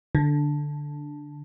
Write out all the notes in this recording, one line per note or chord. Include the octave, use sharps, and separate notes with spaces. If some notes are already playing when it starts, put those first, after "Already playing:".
D3